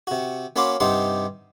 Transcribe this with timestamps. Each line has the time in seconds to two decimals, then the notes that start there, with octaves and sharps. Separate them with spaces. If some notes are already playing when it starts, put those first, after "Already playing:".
0.07 C3 F#4
0.56 A#3 C#4 F#4 B5 C6 D6
0.80 G2 C3 D#4 G4 F#5 C6